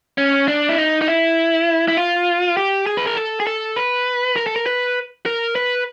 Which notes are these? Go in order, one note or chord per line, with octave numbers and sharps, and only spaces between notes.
C#4
D4
E4
D#4
D#4
E4
E4
F4
G4
G#4
B4
A#4
A4
G#4
A4
B4
A#4
A4
A#4
B4
A#4
B4